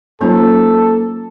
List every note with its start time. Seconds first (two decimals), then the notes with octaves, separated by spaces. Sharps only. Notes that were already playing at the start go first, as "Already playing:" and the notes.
0.21 F#3 A#3 C#4 D#4 F4 A4 C5